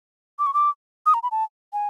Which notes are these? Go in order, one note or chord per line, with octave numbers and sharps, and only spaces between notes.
D6
C#6
D6
D#6
A#5
B5
A5
G#5